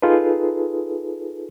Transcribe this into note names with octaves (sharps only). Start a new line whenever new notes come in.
D#4 F4 G#4 A4 B4